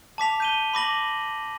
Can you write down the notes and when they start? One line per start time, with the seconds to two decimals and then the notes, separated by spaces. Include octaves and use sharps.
0.18 A5 D6 B6 F7
0.40 G6 D#7 G7
0.74 B5 D6 A#6 F#7